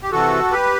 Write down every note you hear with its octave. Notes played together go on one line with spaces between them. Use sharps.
G4
C3 E3 F#4 A4
G4 B4